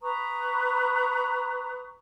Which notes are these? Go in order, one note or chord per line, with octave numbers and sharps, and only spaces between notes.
B4 A#5 C#6 D#6